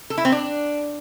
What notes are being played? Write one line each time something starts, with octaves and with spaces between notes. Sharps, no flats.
A4
E4
C4
D4